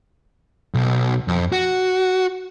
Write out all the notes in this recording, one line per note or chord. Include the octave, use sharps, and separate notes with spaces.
B1
F2
F#4